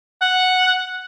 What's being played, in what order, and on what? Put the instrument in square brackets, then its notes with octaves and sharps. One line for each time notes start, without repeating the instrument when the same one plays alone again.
[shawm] F#5